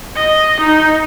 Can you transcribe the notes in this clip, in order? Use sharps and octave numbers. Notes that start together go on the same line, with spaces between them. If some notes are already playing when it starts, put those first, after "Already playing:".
D#5
D#4